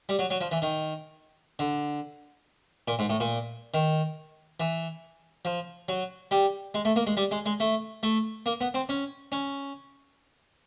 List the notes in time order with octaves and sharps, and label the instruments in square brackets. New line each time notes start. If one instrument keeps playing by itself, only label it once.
[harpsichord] G3
F#3
F#3
F3
E3
D#3
D3
A#2
G#2
A2
A#2
D#3
E3
F3
F#3
G3
G#3
A3
A#3
G#3
G3
G#3
G#3
A3
A3
A#3
B3
C4
C#4
C#4